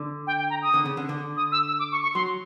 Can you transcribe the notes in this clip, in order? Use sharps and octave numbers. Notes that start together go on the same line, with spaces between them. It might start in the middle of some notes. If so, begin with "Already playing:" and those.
Already playing: D3
G5
G5
A#5
D#6
D3
C#3
D3
D3
D#6
E6
E6
D6
C#6
C#6
F#3 C6